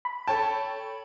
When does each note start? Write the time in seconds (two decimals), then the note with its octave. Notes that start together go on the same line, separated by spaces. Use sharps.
0.05 B5
0.27 A4 C#5 G5 A5